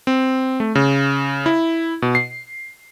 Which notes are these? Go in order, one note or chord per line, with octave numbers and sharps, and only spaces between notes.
C4
A3
C#3
E4
B2
C7